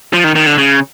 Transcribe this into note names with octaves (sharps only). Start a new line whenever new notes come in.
F3
D#3
D#3
D3
C#3